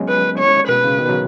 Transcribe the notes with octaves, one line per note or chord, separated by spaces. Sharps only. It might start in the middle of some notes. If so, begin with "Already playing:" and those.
Already playing: F#3 G#3 B3 C#4
B4
C#5
B2 B4
C#3
B2 D#3
C#3 F#3